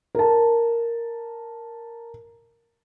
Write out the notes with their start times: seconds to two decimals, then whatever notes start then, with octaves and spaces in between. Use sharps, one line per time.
0.15 A#4 A5